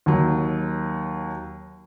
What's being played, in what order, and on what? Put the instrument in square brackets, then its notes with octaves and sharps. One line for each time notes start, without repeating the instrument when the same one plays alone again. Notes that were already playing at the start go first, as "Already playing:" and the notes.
[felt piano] D#2 F#3